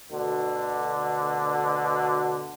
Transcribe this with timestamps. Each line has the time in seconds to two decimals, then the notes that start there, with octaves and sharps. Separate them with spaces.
0.11 D2 B2 D3